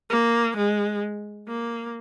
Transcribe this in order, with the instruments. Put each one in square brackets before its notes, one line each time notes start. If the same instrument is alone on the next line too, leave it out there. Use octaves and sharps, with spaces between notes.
[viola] A#3
G#3
A#3